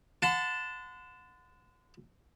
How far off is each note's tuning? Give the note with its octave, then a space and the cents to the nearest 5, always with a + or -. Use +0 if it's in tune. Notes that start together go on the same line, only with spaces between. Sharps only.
F#5 -30 A5 +0 C6 -40